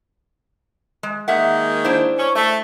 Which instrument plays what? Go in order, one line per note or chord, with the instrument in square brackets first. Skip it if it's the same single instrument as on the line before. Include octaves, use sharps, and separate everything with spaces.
[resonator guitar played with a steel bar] G#3
[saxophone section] D#3 G#3 A#3 [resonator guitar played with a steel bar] E5 F#5
[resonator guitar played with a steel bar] D4 E4 C5
[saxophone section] C#4
A3